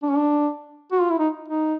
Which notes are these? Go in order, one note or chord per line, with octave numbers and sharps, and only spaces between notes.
D4
C#4
D4
F#4
F4
E4
D#4
D#4